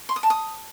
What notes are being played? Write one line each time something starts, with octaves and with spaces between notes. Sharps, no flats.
C6
D#6
A5
D#6